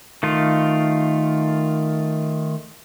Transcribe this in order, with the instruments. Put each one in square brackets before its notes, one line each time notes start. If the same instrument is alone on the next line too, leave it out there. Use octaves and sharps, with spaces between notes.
[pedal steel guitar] D#3 A3 F4